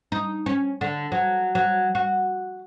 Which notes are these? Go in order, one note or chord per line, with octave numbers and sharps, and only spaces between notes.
D#4
C#4
D3
F#3
F#3
F#4